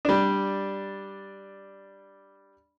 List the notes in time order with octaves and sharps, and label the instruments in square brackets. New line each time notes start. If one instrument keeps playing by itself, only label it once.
[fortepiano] G3 D4